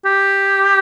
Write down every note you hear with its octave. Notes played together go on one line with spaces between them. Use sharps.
G4